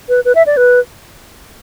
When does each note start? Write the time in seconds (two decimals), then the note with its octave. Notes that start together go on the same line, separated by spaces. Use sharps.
0.09 B4
0.25 B4
0.35 E5
0.46 D5
0.57 B4